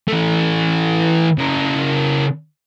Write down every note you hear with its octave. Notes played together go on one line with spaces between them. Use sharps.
E3 A3
C#3 A#4